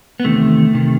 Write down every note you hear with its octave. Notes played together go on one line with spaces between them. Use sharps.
B3
E2 C3 D#3 A3
C3 D#3